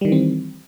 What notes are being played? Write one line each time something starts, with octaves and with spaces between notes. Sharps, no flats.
D#3 E3 G3 C4